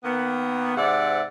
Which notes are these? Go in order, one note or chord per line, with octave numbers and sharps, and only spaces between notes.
D#3 A#3 B3
G#2 C3 D5 E5 F#5